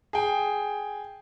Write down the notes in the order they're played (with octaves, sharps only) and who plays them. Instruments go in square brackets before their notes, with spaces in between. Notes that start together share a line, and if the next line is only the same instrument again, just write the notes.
[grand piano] G#4 G5